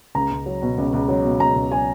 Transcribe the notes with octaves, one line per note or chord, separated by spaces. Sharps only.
C#2 A#5
C#2
F#3
B2
C#2
C#2
F#3
B2
C#2 A#5
C#2
F#3 G#5